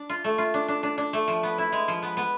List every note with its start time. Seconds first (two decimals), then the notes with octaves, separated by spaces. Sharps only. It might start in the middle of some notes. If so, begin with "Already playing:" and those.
Already playing: D4
0.09 F4
0.24 A3
0.38 F4
0.54 D4
0.68 D4
0.83 D4
0.98 D4
1.13 A3
1.28 F3
1.43 B3
1.58 E4
1.72 G#3
1.88 F3
2.02 B3
2.17 B3